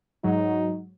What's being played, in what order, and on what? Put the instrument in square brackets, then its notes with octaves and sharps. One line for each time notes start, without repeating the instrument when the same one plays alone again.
[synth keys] G#2 F#3 [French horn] D#4